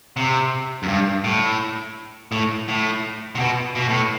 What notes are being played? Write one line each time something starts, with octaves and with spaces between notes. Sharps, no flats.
C3
F#2
G2
A2
A2
A2
C3
B2
B2
A2